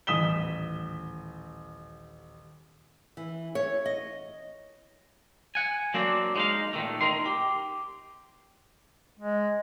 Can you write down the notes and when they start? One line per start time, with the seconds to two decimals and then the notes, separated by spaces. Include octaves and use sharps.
0.07 D#1 A1 D#6 B6 E7 G7
3.17 E3
3.55 C#5
3.86 D#5
5.55 F#5 G#5
5.94 F#3 A#3 C4 D4
6.36 G#3 D#4 F5
6.73 A#2 D#3 A3
7.01 D#4 A#4 C6
7.26 G4
9.19 G#3